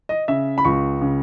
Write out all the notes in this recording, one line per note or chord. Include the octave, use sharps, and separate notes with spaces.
D#5
C#3 E5
B5
C#2 C#6
C#3